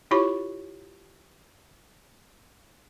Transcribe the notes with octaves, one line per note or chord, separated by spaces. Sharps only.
E4 F4 G4 C#5 B5 C#6